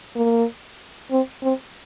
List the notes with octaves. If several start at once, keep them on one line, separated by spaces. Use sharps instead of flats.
A#3
C4
C4